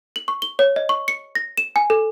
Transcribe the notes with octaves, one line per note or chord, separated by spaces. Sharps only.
F#7
C#6
G7
C#5
D#5
C#6
C#7
A#6
E7
G#5
A4